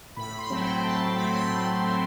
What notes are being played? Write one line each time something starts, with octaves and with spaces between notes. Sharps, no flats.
A2 B5
C6
F#3 A3 C4
G5
A2 A5
F#3 A3 C4 B5
C6
A2
F#3 A3 C4